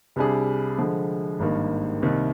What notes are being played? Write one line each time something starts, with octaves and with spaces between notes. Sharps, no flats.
C2 C3 G3 D4 G#4
D3 F3 G#3
G#1 G2 D#3 A#3
C2 C3 D#3 A#3